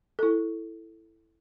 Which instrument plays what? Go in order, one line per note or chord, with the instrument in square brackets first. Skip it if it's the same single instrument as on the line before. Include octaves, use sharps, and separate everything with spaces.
[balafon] E4 A4